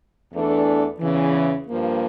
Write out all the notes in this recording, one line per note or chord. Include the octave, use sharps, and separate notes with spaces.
E2 E3 A3 D4 A4
E2 C#3 E3
G2 F3 A#3